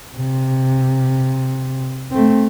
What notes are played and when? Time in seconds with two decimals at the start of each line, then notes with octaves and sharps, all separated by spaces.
0.16 C3
2.11 A3 C4